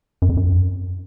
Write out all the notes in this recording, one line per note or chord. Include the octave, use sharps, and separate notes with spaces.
F#2
F2
F#2